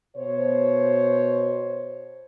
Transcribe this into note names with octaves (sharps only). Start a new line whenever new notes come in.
B2 C5 C#5